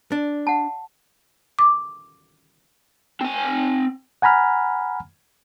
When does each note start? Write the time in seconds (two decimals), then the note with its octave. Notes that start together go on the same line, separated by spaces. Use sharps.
0.12 D4
0.47 F#5 A5
1.59 D6
3.21 C4 G#5
4.22 F#5 G#5 A#5 B5 F6